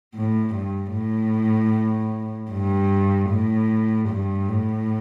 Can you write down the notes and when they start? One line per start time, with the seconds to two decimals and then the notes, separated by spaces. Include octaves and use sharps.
0.15 A2
0.55 G2
0.94 A2
2.51 G2
3.30 A2
4.10 G2
4.49 A2